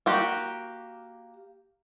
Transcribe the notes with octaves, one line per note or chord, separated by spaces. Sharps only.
A#3 F#4 G4